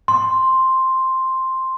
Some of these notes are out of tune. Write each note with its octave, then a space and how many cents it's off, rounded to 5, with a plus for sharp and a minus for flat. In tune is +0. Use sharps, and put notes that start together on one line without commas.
C6 +5